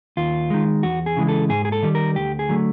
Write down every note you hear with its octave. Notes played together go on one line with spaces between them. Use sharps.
D#2 F4
D#3 G#3
E2 F#4
G#4
C#3 E3 G#3
A4
G#2 G#4
G#4
A4
D#3 G3
A#4
D2 G4
G#4
D3 F#3 A3